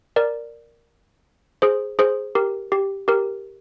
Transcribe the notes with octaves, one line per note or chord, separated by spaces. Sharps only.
A#4 D5
G#4 C5
G#4 C5
G4 A#4
G4
G4 A#4